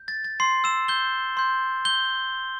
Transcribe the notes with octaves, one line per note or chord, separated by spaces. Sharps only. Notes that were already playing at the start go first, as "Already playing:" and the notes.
Already playing: G6
A6
A6
C6 C7
E6 E7
G6 G7
C6 G6
G6 G7